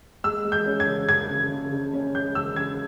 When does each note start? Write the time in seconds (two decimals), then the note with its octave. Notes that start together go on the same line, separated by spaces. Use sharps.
0.24 G#3 E6
0.45 G#3
0.52 G6
0.66 C#4
0.80 G#6
0.87 C#3
1.08 C#3 G#6
1.29 C#3
1.51 C#3
1.72 C#3
1.93 C#4
2.15 G#3 G6
2.35 C#3 E6
2.56 C#3 G#6